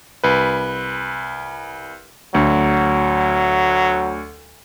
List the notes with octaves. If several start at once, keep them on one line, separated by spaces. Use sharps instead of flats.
C2 B4
D2 F#3